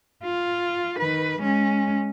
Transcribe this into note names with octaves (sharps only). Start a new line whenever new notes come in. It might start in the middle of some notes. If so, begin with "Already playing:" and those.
F4
D#3 B4
G#3 C#4